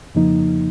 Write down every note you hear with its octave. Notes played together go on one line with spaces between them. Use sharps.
F2 C#3 F3 A#3 D#4